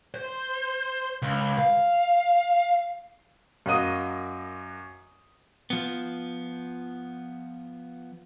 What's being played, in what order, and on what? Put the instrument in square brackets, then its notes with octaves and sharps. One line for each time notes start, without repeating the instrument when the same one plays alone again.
[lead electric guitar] C5
C#2
F5
[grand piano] F#2 A#3 F#4 D#5 D#6 D#7
[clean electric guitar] F3 B3